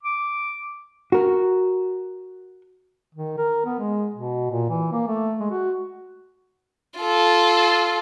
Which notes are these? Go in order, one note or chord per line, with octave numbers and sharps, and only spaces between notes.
D6
F#4 A#4
D#3
A#4
B3
G#3
B2
A#2
E3
A#3
A3
G#3
F#4
F4 A4